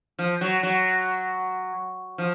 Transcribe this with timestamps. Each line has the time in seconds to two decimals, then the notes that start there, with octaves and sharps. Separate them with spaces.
0.19 F3
0.41 F#3
0.63 F#3
2.18 F3